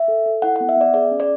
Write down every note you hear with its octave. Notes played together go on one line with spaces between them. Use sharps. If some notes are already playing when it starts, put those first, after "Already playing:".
Already playing: E5
A4
A4
E4 F#5
F#5
B3
E5
B3 D5
G#4 D5
C#4
D5